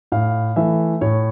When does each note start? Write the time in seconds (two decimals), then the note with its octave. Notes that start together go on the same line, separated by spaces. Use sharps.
0.12 A2 F5
0.56 E3 A3 E5
1.01 A2 C#5